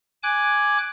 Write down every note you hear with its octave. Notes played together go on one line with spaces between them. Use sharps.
G#5 D6 F#6